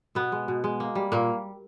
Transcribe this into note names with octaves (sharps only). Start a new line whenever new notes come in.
B2 B3
G#3
B2
G#3
A#3
G3
A#2 A#3